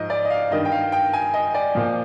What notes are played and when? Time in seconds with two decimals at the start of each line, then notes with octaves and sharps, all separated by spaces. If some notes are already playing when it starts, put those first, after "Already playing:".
Already playing: G#2 F3 D#5
0.10 D5
0.25 D#5
0.30 F5
0.51 G2 D#3 D#5
0.65 G5
0.71 F5
0.92 G5
1.13 G#5
1.34 D#5
1.54 D5
1.75 A#2 F3